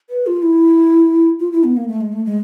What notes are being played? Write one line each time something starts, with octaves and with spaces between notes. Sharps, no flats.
B4
F4
E4
F4
E4
B3
A#3
A3
G#3
A3
G#3